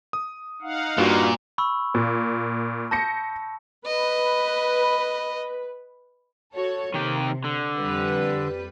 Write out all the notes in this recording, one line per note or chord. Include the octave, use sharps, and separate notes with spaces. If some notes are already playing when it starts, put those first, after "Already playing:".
D#6
D#4 F5 F#5
G2 A#2 F4 F#4
B5 C#6 E6
A#2
A5 G6 A#6 C#7
B4 D#5
F#4 A4 C#5
C3 D#3 G4
D3
F2 G3 B4